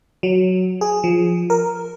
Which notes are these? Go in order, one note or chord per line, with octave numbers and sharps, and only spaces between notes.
F#3
G#4
F3
A#4